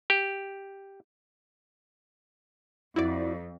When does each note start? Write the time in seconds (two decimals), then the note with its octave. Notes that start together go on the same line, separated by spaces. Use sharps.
0.10 G4
2.96 F2 E4 F#4 D5